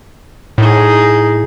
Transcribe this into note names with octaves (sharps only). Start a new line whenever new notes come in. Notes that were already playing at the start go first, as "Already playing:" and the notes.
A2 D#4 G#4